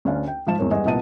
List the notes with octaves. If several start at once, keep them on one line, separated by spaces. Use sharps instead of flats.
D2 C#4 D4 F5
G5
G#2 F3 F4 F5 A5 E7
E2 G#2 C4 A#4 C#5
G2 G#3 B3 D#5 G#5
C2 A#2 B3 D#5 A5 D#7